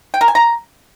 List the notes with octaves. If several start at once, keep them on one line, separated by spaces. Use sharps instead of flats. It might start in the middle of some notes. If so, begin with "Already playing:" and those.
G5
A#4
G#5
A#5